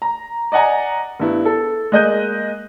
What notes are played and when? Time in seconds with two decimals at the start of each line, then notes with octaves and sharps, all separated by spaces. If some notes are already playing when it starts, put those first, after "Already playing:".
0.02 A#5
0.52 D5 D#5 F#5 G#5 A#5
1.20 G2 B3 E4
1.45 A4
1.92 G#3 A#3 D#5 F#6 G6 D#7